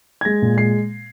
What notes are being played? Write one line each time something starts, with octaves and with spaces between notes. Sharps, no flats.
G#6
G#3 A#6
A#2
G#3 C7